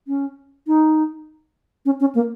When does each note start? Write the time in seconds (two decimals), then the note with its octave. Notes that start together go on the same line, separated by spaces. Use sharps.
0.08 C#4
0.67 D#4
1.86 C#4
2.00 C#4
2.15 A#3